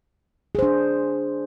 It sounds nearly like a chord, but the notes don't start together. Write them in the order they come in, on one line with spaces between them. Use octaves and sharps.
G#4 C5 D4